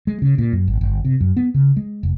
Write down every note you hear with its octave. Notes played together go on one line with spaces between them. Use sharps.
G#3
C#3
A#2
F#2
G#1
G1
C3
F#2
B3
C#3
G#3
F1